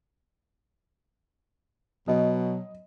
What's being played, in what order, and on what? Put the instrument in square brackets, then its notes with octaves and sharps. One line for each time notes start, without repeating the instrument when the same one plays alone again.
[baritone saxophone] B2 [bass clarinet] F#3 [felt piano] D#5